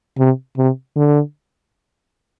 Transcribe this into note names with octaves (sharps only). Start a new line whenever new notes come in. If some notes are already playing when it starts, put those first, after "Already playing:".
C3
C3
D3